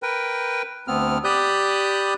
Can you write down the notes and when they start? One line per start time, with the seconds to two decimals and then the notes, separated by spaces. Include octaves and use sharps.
0.03 A#4 B4 G5
0.88 D2 B3 C4 F6
1.24 G4 D5 B5 D#6 F#6 G6